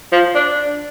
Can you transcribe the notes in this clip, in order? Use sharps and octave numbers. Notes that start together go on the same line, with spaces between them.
F3
D4